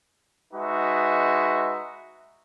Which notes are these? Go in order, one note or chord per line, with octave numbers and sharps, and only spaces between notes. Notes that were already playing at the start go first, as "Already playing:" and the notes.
G#3 D#4 F#4 B4 E5